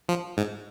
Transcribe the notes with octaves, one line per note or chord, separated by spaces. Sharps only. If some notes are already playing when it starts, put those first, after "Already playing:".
F3
G#2